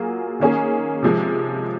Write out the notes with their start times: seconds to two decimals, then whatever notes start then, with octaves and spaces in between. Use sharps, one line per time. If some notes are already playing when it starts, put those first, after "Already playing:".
Already playing: F#3 A#3 F4 G#4
0.40 D#3 A#3 C#4 G#4
1.03 C3 F3 G#3